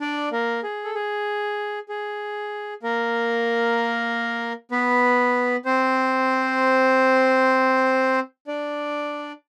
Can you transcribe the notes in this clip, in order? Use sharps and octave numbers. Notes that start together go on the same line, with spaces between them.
D4 D5
A#3 A#4
G#4
A4
G#4
G#4
A#3 A#4
B3 B4
C4 C5
D4 D5